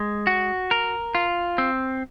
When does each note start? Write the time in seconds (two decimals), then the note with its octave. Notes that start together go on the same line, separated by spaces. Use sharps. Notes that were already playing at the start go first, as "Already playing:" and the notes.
Already playing: G#3
0.27 F#4
0.71 A#4
1.15 F4
1.58 C4